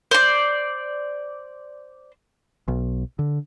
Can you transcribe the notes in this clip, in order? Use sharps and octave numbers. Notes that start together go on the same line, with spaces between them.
C5 D5
B1
D3